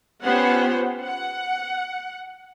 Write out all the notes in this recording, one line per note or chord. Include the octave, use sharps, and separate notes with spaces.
B3 C#4 F4 G4 C5 F#5
F#5